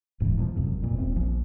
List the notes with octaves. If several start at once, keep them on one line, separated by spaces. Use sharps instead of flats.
D#1 G#2 C#3 E3
E2 B2 D3 F3
F1 C#2 F#2 C3
F#1 F2 A#2
D#1 C4
A#1 F3